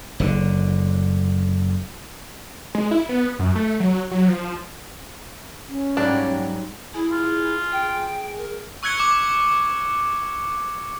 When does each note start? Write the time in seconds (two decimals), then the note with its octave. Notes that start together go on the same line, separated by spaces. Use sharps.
0.20 F#1 D3
2.75 G#3
2.91 E4
3.09 B3
3.39 F#2
3.55 A3
3.80 F#3
4.11 F#3
4.28 F3
5.68 C#4
5.97 G#2 F#3 G3 A#3 D4
6.94 E4 G#4
7.12 F4
7.72 G5
8.37 A#4
8.83 C#6 E6 F#6 G#6 C#7 G7
9.00 D6 F#6